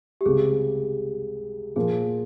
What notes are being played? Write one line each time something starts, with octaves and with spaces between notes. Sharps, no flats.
G4
C#2 C3 G3 G#4
A#2 F3 A#3 G#4